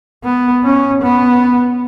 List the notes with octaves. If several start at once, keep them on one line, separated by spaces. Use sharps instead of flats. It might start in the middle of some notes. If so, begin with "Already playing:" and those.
B3
C#4
B3